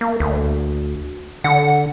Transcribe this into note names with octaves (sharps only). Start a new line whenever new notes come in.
A#3
D2
D3 F#5